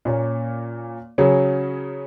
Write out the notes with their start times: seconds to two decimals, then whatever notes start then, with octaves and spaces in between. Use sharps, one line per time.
0.05 A#2 A#3 C#4
1.18 C#3 F#3 C#4 G#4